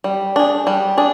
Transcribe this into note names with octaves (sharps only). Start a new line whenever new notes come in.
G3
D4 G#4
G3
D4 G#4